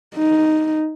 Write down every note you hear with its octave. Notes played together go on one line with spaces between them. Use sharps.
D#4